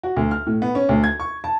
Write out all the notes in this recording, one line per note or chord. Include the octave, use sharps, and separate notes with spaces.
F#4
D2
F6
A2
B3
C#4
D2
G#6
C#6
A5